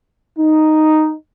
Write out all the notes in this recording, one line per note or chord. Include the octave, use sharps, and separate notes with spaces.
D#4